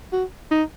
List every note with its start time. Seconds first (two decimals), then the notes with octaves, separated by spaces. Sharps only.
0.12 F#4
0.51 D#4